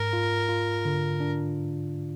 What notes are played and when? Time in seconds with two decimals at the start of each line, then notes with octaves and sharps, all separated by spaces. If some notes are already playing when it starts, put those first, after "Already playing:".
Already playing: G#2 A#4
0.13 F4
0.49 F4
0.85 D3
1.20 D4